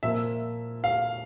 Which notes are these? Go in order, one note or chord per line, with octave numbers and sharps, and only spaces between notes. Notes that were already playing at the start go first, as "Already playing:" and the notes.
A#2 F3 A#3 E5
F5